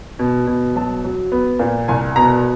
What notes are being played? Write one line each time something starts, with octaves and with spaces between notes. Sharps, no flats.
B2
B2
F#3 A5
F#3
B3
A#2
C2 G#5
B2 A#5